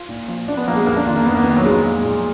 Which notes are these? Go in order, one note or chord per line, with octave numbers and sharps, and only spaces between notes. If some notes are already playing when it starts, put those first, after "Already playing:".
Already playing: F4
A#2
F3
A#2 D4
B3
F3 A#3
G#3
F2 A#3
D4
D#3 F4
A#3
F2 B3
A#3
D#3 B3
F#3
A#2 G#3
F3
A#2